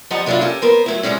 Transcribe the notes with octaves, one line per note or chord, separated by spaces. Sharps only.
F2 F3 G3 D#5 F#5 A#5
C3 F#3 D4 E4 F4
C#4 G4 A4 A#4
B3 A#4 C5
F#3 A3 E4
C3 E3 G3 G#3 C#4